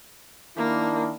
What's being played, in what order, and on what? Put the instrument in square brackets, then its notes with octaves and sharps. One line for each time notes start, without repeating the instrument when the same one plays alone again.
[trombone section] D#3 D4 E4 [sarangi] A#3